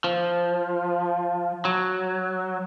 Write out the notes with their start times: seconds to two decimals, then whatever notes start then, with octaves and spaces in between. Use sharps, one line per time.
0.04 F3
1.65 F#3